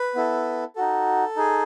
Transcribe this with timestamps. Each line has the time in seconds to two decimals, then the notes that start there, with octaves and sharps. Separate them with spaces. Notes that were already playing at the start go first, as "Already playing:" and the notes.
Already playing: B4
0.15 B3 E4 A4
0.76 D#4 F#4 A4
1.36 D#4 G#4